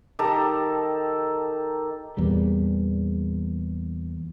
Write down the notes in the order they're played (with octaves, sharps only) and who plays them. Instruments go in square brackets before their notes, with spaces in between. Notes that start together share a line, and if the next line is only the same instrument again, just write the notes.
[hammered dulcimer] D#3 G4 A4 A#5
[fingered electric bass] E2 A#2 G3